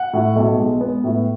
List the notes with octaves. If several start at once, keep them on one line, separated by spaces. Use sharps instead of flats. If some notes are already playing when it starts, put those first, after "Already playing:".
Already playing: F#5
A2
B1
G#3
B3
A2